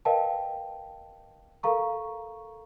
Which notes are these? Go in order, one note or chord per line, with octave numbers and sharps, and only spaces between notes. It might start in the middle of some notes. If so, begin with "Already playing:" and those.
A#4 B4 D#5 F5 G5 A5
A4 A#4 F5 A#5 C#6